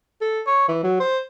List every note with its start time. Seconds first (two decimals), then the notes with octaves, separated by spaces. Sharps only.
0.21 A4
0.47 C#5
0.68 E3
0.83 F#3
1.00 C5